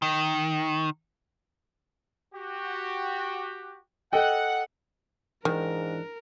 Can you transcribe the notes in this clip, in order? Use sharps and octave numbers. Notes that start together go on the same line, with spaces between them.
D#3
F#4 G4
A4 D#5 F#5 G5
G#2 D#3 E3 D4 A#4